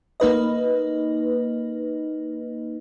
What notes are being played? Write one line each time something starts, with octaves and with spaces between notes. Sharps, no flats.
A#3 D#4 B4 D#5